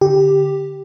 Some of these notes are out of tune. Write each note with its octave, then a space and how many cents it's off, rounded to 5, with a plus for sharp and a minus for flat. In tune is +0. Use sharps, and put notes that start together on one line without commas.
D3 -20 G4 +0